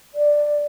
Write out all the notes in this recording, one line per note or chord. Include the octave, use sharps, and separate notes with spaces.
D5